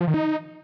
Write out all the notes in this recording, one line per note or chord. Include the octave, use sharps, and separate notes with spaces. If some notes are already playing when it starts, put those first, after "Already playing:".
F3
D#3
D#4